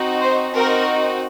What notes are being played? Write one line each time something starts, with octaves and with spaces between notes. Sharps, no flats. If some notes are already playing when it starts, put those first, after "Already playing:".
Already playing: C4 D#4 F#4
C5
C4 D#4 F#4 A#4